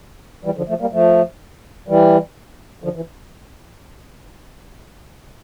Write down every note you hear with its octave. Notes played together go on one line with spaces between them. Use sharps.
E3 G3
D3 F3
F3 A3
G3 A#3
F3 A3
E3 G3
D3 F3
E3